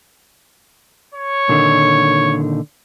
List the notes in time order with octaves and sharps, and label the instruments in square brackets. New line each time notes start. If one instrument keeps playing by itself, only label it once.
[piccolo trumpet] C#5
[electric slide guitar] A#2 D3 D#3